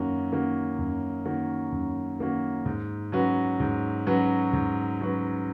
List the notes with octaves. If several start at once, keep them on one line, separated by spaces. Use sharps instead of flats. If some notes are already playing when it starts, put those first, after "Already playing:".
Already playing: F#2 D#3 A#3 C#4 F#4
D#3 A#3 C#4 F#4
F#2
D#3 A#3 C#4 F#4
F#2
D#3 A#3 C#4 F#4
G#2
F#3 C#4 F#4 B4
G#2
F#3 C#4 F#4 B4
G#2
F#3 C#4 F#4 B4